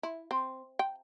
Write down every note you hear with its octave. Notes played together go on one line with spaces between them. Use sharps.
E4
C4
G5